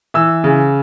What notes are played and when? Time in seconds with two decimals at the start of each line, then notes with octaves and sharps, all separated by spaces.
0.14 E3 E6
0.44 C#3